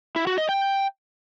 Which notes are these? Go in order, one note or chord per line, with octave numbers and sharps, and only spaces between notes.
E4
F#4
D#5
G5